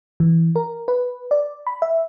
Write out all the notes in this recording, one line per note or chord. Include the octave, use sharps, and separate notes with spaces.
E3
A#4
B4
D5
B5
E5